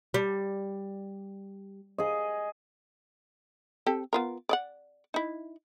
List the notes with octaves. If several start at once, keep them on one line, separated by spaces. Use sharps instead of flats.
G3
G#4 D#5
C4 G4 A4
B3 F4 A#4
D5 D#5 F#5
D#4 E4